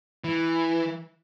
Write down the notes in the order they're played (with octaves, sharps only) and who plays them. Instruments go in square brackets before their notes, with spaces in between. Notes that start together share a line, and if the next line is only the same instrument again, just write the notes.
[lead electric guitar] E3